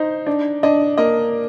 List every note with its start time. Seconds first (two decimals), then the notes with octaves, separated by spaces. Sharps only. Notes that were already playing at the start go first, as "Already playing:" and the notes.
Already playing: D#4 C5
0.26 D4
0.63 D4 D#5
0.98 A#3 D#5